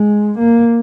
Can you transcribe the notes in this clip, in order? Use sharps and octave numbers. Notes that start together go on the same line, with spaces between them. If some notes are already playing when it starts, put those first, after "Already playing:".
Already playing: G#3
A#3